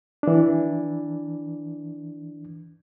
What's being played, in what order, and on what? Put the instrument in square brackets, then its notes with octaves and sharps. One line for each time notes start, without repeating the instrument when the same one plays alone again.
[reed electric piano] E3 D4